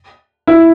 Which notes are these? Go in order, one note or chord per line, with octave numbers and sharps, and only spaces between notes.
E4